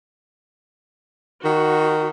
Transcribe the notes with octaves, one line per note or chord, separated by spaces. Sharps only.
D#3 F#4